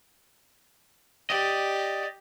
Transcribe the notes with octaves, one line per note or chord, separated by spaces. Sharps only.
G4 D5 D#5